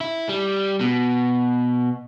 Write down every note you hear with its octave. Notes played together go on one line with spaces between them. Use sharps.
E4
G3
B2